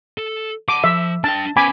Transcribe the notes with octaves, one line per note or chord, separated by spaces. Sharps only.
A4
F#5 A5 D6
F3 E5
D4 G5 A5
B3 C#4 G#5 B5 D6